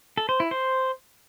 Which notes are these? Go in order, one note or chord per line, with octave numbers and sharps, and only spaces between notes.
A4
C5
E4
C5